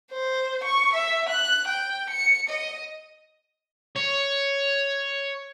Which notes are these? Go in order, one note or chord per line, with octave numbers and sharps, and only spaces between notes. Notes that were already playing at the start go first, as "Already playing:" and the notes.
C5
C#6
E5
F#6
G5
C#7
D#5
C#5